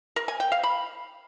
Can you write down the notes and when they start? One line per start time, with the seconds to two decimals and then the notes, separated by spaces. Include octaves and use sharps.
0.16 A#4
0.28 G#5
0.40 G5
0.52 F5
0.63 B5